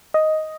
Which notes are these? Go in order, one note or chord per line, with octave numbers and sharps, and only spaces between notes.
D#5